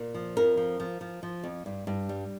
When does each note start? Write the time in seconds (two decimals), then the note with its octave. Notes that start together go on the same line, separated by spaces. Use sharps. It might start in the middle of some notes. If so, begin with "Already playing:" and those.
Already playing: A#2
0.14 F3
0.37 F2 A#4
0.57 F3
0.80 F3
1.01 F3
1.23 F3
1.44 F2
1.66 G2
1.87 G2
2.09 G3